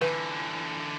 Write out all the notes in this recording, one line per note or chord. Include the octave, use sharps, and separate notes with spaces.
D3 E3 B4